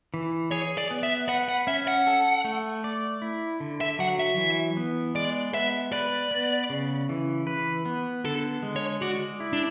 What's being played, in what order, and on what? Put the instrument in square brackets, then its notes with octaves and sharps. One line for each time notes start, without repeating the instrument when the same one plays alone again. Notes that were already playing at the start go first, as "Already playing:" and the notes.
[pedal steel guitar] E3
[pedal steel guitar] G#4 [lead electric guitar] C#5
[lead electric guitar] D5
[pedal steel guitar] B3
[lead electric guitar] E5
[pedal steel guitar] B4 [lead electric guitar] F#5
[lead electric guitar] F#5
[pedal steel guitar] C#4 [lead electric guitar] E5
[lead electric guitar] F#5
[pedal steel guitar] A4
A3
D5
E4
D3
[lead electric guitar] E5
[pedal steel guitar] F#3 [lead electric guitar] F#5
[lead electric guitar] E5
[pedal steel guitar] E3
B3
[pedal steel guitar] G#3 [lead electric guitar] D5
[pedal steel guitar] B3 [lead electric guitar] E5
[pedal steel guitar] B4 [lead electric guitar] D5
[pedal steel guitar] B3
C#3
E3
B4
B3
[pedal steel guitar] D3 [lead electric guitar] A4
[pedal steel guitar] G#3
[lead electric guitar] C#5
[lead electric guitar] F#4 [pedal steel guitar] D5
[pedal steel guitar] E4
[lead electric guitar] D4